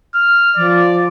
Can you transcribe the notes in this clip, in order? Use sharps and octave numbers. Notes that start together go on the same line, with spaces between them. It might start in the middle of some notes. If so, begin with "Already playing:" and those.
F6
F3 D5